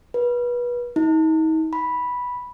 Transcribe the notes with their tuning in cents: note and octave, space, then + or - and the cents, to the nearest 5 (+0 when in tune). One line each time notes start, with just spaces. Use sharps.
B4 -30
D#4 +40
B5 -5